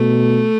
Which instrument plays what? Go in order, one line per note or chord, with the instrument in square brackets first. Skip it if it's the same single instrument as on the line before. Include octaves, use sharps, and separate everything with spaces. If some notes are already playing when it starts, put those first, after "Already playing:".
Already playing: [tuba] B2 [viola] A3